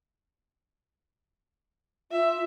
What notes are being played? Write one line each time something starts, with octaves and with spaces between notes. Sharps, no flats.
F4 E5